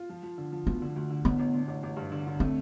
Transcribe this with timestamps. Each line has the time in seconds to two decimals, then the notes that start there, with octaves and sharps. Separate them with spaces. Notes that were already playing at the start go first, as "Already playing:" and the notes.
Already playing: F4
0.09 F3
0.23 F3
0.38 D3
0.52 F3
0.66 D2 B3
0.82 D3
0.96 D2
1.10 D3
1.25 A1 B3
1.39 A1
1.54 D3
1.68 A1
1.83 A1
1.97 G2
2.12 D3
2.27 D3
2.40 A3 C4